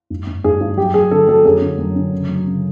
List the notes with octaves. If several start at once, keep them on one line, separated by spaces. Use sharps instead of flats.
G2
G2
G2 G#4
G2
F#3 G4
F#3 G#4
D3 A4
F#3 A4
F#2 G#4
D3
F#2
D3
C#3
F#3
C#3